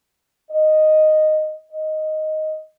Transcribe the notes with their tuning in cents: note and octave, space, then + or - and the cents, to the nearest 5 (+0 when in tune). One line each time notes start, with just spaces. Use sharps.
D#5 -5
D#5 +0